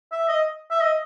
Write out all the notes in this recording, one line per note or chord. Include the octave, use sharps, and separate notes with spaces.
E5
D#5
E5
D#5